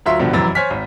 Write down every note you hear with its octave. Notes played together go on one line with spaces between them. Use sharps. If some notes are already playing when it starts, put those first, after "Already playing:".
D2 F#3 F4 E5 C6 B6
C#2 G2 B2 D3 F3
F1 F#2 E3 A#5 A6
C5 C#5 G#5 F6 B6
G#1